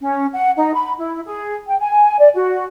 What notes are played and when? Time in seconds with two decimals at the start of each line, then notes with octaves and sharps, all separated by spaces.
0.02 C#4
0.33 F#5
0.57 D#4
0.74 B5
0.98 E4
1.26 G#4
1.67 G5
1.79 G#5
2.19 D5
2.34 F#4